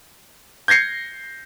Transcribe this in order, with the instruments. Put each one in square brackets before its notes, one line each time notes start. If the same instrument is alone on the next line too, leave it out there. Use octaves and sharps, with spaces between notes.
[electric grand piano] G6 G#6 A#6 C7 C#7